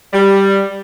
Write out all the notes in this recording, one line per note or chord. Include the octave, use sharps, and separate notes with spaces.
G3